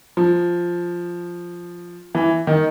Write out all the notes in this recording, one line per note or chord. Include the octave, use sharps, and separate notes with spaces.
F3
E3
D#3